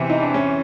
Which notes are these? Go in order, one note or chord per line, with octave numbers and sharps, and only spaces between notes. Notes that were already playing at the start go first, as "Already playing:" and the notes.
Already playing: E2 C3 E3
D#4
D4
C#4